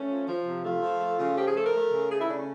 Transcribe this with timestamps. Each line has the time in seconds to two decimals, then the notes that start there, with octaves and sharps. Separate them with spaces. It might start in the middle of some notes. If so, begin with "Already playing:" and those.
Already playing: A3 C#4
0.08 F3
0.27 F3
0.45 C3
0.64 A3 F4
0.82 F3
1.01 A3
1.19 C#3
1.36 F3 G4
1.47 G#4
1.55 A3 A4
1.65 A#4
1.74 A3
1.93 C#3
2.11 A3 G#4
2.20 E4
2.29 C#3 D4
2.39 C#4